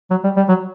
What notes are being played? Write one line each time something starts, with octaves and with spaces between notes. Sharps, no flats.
F#3
G3
G3
F#3